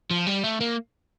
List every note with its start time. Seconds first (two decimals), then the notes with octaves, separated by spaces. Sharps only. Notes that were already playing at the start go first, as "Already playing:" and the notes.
0.11 F3
0.27 G3
0.44 A3
0.61 A#3